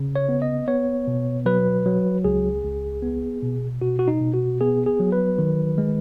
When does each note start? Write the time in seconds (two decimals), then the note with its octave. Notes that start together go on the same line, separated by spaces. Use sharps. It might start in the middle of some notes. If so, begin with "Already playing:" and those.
Already playing: C#3
0.16 C#5
0.29 B3
0.42 D#5
0.67 B3 C#5
1.07 B2
1.46 F#3 B4
1.86 F#3
2.24 C#2 G#4
2.64 C#2
3.03 B3
3.42 B2
3.81 B2 F#4
3.99 F#4
4.08 D#4
4.21 B2
4.34 F#4
4.61 B3 G#4
4.86 G#4
5.00 F#3
5.12 B4
5.38 D#3
5.78 G#3